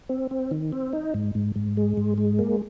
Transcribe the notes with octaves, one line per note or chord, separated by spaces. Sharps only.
C4
C4
D#3
C4
D#4
G#2
G#2
G#2
G#3
G#2
G#3
A#3